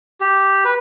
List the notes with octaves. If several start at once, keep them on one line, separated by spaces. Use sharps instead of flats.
G4
B4